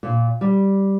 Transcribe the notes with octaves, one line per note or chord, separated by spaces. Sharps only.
A#2
G3